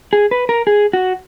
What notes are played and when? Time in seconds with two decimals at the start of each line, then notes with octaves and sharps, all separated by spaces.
0.13 G#4
0.31 B4
0.49 A#4
0.67 G#4
0.93 F#4